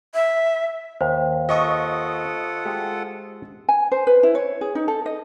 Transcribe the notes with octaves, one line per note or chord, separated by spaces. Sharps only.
E5
D#2 C5
F4 A4 D#5 F#5 C#6 D#6
G#3 F#4 G4
G#5
C5
B4
E4
C#5
G#4
D#4
A4
D#5